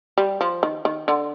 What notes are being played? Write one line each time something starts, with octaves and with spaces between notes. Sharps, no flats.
G3
F3
D#3
D#3
D3